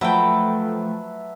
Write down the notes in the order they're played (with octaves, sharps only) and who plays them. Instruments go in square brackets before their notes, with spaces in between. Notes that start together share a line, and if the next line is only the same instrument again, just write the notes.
[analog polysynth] F3 A3 [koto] F#3 G5 [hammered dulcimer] B4 E5 A5